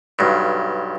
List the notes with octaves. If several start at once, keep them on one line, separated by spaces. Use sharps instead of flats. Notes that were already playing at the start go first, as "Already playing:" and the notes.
B1 G2